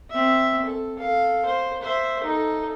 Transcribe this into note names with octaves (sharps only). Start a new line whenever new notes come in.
C4 E5
A4
A4 F5
C5
C5 E5
D#4 A4